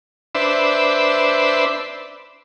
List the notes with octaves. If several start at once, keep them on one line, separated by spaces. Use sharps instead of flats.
D4 B4 C5 E5